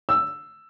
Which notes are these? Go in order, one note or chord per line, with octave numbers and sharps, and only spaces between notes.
E6